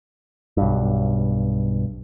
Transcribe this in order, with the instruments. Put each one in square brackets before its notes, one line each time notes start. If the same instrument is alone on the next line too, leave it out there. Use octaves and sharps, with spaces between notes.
[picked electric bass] B1 G2